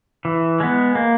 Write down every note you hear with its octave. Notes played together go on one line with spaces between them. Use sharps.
E3
G#3 B3
A#3